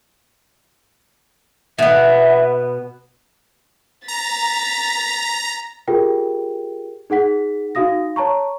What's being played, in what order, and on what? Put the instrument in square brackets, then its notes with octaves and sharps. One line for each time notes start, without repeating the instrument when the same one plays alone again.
[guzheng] B2 B3 [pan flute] E5
[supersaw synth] A#5 [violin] A6 B6
[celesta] F4 G4 G#4 A#4 G5
D#4 G#4 F#5 B6
D#4 F#4 F5 D#6 A#6
C#5 A5 A#5 C#6